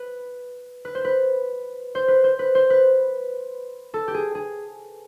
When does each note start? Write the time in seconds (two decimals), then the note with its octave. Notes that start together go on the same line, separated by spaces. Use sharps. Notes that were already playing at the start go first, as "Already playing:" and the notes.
Already playing: B4
0.85 B4
0.95 C5
1.04 B4
1.95 C5
2.08 B4
2.24 C5
2.39 B4
2.55 C5
2.70 B4
3.94 A4
4.08 G4
4.14 G#4
4.35 G#4